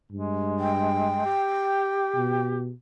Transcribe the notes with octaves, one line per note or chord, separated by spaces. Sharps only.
G2 G#3
G5
G4
B2